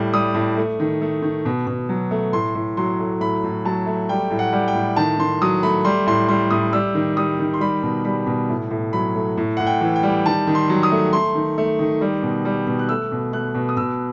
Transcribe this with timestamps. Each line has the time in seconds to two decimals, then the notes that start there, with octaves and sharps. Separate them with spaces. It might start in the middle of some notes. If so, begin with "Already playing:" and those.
Already playing: A2 G3
0.13 G3 D#6
0.34 A2
0.57 A3
0.80 D#3
1.02 A3
1.22 D#3
1.45 B2
1.67 B2
1.89 F#3
2.11 A3
2.33 A2 C6
2.55 A2
2.77 F#3 C6
2.99 A3
3.20 A2 B5
3.44 A2
3.65 F#3 A5
3.86 A3
4.09 G3 G5
4.30 A2
4.39 F#5
4.53 G3
4.68 G5
4.75 A2
4.96 D#3 A5
5.19 D#3 C6
5.42 F#3 D#6
5.63 A3 B5
5.85 G3 C6
6.06 A2 C6
6.28 G3 C6
6.50 A2 D#6
6.73 G3 E6
6.95 D#3
7.17 G3 D#6
7.39 D#3
7.54 C6
7.61 G3 B5
7.83 B2
8.05 G3 B5
8.27 B2
8.49 A2
8.71 A2
8.93 F#3 B5
9.15 A3
9.37 A2
9.57 A2 F#5
9.67 G5
9.81 E3
9.96 G5
10.03 G3
10.25 D#3 A5
10.47 D#3
10.55 C6
10.69 F#3
10.83 D#6
10.92 A3
11.13 A3 C6
11.35 D#3
11.58 A3
11.79 D#3
12.01 G3
12.23 B2
12.45 G3
12.67 B2
12.79 F#6
12.89 A3 E6
13.12 B2
13.33 A3 F#6
13.55 B2
13.69 D#6
13.77 B2 E6